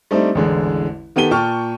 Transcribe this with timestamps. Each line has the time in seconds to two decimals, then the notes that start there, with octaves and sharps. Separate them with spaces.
0.11 G3 A3 C4 D4 D#4
0.35 A1 E2 D3 G#3
1.16 D#3 B3 G4 A4 D#7 G7
1.31 A#2 G5 A5 C#6 F6